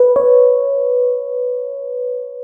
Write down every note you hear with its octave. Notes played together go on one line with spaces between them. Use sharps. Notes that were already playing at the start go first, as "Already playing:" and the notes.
Already playing: B4
C#5